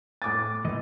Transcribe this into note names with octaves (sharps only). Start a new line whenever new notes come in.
A2 G#5 D6 A6
A#2 E3 D#5